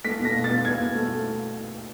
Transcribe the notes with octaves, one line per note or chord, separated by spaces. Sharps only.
A3 B6
B2
A#6
B2
A6
B2
B2 G#6
B2
A3